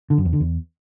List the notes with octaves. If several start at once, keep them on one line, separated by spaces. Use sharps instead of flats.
D3
F#2
E2
D3
E2